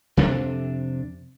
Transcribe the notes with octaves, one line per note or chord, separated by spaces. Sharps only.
F2 C3 D4